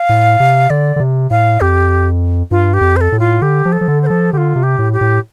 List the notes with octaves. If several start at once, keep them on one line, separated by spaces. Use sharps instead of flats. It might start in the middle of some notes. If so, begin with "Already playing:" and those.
Already playing: F5
A2
C3
D3 D5
D3
C3
A2 F5
F2 G4
G2 F4
G4
F2
C5
A4
A2
F4
D3 G4
F3
A4
F3
D3
C5
F3 A4
D3 F4 G4
C3
G4
A2
G4
A2